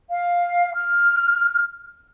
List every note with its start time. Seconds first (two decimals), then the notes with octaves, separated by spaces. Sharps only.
0.11 F5
0.74 F6